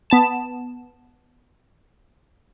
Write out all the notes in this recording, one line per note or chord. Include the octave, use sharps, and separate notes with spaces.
B3 A5 E7